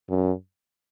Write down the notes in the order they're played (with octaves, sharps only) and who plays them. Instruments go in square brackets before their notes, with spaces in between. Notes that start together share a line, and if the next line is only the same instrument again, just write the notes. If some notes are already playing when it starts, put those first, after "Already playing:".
[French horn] F#2